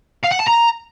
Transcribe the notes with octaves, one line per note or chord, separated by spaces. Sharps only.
F5
F#5
A5
A#5